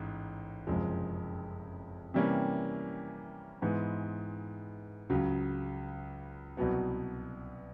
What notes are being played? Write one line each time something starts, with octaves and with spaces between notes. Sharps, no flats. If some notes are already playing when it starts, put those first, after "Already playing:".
Already playing: A1 G#2
F#1 F2 C3 F3 G#3
C3 E3 G3 A#3 C#4
G#2 E3 G#3 B3
C#2 C#3 F#3
C2 B2 F#3 B3